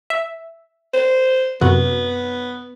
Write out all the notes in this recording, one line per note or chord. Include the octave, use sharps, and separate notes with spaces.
E5
C5
F#2 C3 B3 F#4